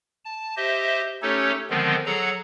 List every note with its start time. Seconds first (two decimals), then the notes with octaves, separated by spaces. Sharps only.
0.25 A5
0.57 G4 C5 D#5 E5
1.22 A3 C#4 D#4 G4 A4 C#5
1.70 D3 D#3 F3 G#3 B3 C4
2.06 F#3 G#4 A4 F#5 A#5